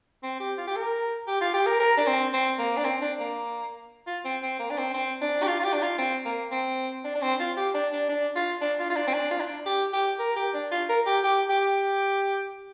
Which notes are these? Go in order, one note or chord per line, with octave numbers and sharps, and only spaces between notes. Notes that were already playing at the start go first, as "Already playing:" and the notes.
C4
G4
F4
G4
A#4
G4
F4
G4
A#4
A#4
D4
C4
C4
A#3
D4
C4
D4
A#3
F4
C4
C4
A#3
D4
C4
C4
D4
G4
F4
F4
G4
D4
F4
C4
A#3
C4
D4
D4
C4
F4
G4
D4
D4
D4
F4
D4
F4
F4
D4
C4
D4
F4
D4
G4
G4
A#4
G4
D4
F4
A#4
G4
G4
G4